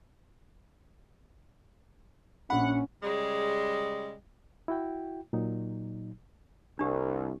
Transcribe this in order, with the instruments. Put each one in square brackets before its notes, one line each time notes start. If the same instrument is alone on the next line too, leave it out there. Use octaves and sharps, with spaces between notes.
[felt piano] A#1 B5 [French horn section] C#4 [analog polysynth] F#5
[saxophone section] C#3 G3 G#3
[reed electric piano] E4 F#4 G5
A#2 F#3 D#4
[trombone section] C2 [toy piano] D4 G4